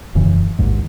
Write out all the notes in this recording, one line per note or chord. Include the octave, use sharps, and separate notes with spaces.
E1 F#2 C#3 E3
A1 D#2 G#2